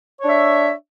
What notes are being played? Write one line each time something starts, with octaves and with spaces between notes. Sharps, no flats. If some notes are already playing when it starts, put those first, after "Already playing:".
D4 C#5 E5